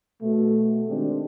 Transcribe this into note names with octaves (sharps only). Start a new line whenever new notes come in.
B2 A3
D#3 G#3 C4 D4 G4